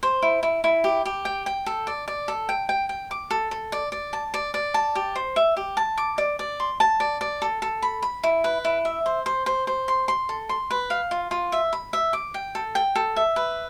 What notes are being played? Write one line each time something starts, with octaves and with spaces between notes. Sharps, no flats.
C5
E4
E4
E4
G4
G4
G5
G5
A4
D5
D5
A4
G5
G5
G5
D6
A4
A4
D5
D5
A5
D5
D5
A5
G4
C5
E5
G4
A5
D6
D5
D5
C6
A5
D5
D5
A4
A4
B5
B5
E4
B4
E4
E5
C5
C5
C5
C5
C6
C6
A4
C6
B4
F5
F4
F4
E5
B5
E5
D6
G5
A4
G5
A4
E5
B4